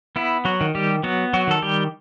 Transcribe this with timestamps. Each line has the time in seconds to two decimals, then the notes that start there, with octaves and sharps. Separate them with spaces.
0.16 B3 E4
0.45 F#3 F#4
0.61 D#3
0.75 G3 G4
1.03 F#3 B3 F#4
1.33 F#3 F#4
1.47 D#3 A4
1.62 G3 G4